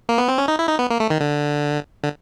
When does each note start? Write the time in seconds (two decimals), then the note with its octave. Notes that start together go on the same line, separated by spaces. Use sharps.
0.09 A#3
0.18 B3
0.28 C4
0.38 C#4
0.48 D#4
0.59 E4
0.69 D#4
0.79 B3
0.90 A#3
1.00 A3
1.10 D#3
1.21 D3
2.04 D3